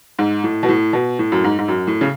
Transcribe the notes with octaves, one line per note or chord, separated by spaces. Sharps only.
G#2
A2
B2
A2
B2
A2
F#2
G#2
G#2
F#2
A2
C#3